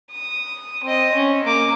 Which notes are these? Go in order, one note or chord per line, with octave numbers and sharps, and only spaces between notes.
D#6
C4 D#5
C#4
A#3 D6